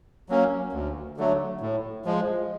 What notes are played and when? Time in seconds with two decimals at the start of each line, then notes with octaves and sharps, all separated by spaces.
0.29 F#3 A#3 C#4
0.73 D2
1.17 D3 F#3 A3
1.61 A2
2.05 F3 G#3